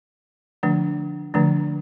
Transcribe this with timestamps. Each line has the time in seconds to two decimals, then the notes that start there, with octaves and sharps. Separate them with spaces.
0.63 D3 F3 A3 D4
1.34 D3 F3 A3 D4